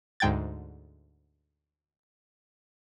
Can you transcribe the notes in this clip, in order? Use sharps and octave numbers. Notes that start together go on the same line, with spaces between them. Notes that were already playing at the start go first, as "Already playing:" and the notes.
D2 G#2 G5 G#6 A6